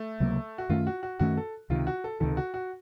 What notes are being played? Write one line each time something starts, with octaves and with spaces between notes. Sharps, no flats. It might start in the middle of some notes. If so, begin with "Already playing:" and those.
Already playing: A3
C#2 C3 F#3 A#3
F#4
F#2 D#3 A3 C#4 F4
F#4
F#4
F#2 D#3 A3 C#4 F#4
A4
C#2 C3 D#3 F4
F#4
A4
C#2 C3 D#3 A4
F#4
F#4